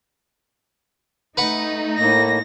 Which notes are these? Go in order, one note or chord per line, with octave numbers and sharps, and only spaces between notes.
A3 D#4 B4 F#5 B5
A2 A#3 A#6